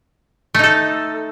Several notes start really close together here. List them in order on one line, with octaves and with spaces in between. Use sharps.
A3 D#4 A4